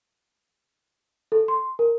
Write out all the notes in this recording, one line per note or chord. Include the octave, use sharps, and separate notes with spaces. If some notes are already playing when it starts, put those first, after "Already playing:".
A4
C6
A#4